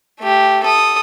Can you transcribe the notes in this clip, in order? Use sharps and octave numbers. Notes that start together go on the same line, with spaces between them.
A3 G4
A4 D#6